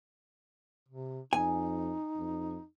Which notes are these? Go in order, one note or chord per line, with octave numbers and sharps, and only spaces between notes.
C3
F2 D#4 G#5
F2